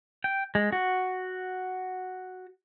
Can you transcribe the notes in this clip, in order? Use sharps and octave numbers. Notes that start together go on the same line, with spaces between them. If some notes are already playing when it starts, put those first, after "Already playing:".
G5
G#3
F#4